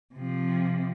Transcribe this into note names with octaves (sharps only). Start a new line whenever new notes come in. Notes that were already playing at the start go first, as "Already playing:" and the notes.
C3 F3